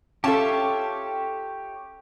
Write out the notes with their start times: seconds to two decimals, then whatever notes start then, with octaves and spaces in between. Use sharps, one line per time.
0.24 C#4 F4 G4 A4 C#5 E5 A5